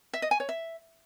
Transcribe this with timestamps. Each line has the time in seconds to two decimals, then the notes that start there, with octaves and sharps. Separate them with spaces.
0.14 E5
0.22 D#5
0.31 G#5
0.40 C#5
0.49 E5